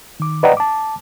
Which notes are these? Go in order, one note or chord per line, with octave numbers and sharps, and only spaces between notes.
D#3 D6
B4 D5 D#5 F#5 G5 A#5
A5 D6